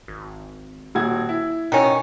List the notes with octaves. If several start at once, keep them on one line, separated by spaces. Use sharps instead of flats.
G#1
D#1 F#4 G#6
E4
B2 D#3 C#4